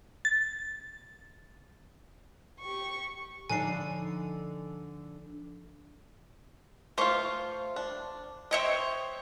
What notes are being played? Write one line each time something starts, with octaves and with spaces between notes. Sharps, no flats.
A6
G4 C#6
D3 F3 D4 D#4 G#5 B5 C7
A3 F4 C5 F5 C#6
D4
C5 C#5 D#5 E5 G5